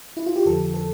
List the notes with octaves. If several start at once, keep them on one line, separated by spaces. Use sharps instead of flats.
E4
F4
G4
F2 D3 F3 A4
A4